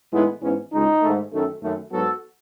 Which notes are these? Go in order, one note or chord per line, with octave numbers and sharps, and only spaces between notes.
A2 E3 G#3 B3 D#4
G#2 E3 B3 C#4
C#2 C#3 G#3 D#4
G#2 D#3 A3
F#2 D#3 A3
F#2 D#3 A3
G#2 F#3 B3 F#4 A4